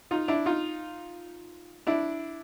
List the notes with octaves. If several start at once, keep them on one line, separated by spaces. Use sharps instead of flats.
D#4 F4
D4 E4
D#4 F4
D4 E4